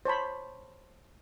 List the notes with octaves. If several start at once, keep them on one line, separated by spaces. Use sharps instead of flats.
C5 C#5 A5 B5